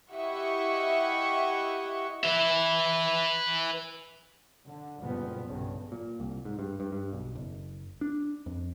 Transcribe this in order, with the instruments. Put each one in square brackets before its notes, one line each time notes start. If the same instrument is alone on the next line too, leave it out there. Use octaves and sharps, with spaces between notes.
[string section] E4 G4 D#5 E5 F#5 C#6
[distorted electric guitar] B4 E5
[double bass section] D3
F#1 A#2 F3 G3 B3
B1 G2 C#3
[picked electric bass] A#2
C2
G#2
G2
G2
G2
B1
F#1
D4
F2